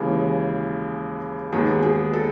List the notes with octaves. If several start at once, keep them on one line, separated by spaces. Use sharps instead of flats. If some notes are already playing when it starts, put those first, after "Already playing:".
Already playing: D#2 C#3 E3 G#3 G#4
D#2 D#3 G#3 B3 G#4
G#4
A4